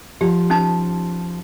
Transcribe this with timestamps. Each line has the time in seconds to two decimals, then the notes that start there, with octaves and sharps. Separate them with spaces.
0.21 F3 G4
0.50 C#4 D#4 A5